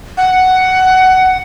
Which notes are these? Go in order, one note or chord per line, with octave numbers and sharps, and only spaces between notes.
F#5